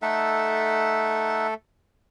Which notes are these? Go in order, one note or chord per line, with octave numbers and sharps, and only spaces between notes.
A3 D#4 A4 E5 F#5